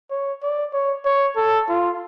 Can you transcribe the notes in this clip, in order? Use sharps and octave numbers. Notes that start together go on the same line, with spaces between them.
C#5
D5
C#5
C#5
A4
F4